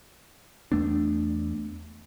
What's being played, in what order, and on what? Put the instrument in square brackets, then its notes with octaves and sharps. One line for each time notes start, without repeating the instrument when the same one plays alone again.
[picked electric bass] E2 A3 B3 D4